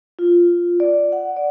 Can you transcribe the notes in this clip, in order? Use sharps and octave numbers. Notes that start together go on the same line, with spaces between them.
F4
D5
F#5
D5